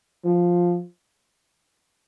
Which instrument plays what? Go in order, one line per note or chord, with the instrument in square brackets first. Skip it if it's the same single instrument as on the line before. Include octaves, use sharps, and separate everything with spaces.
[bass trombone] F3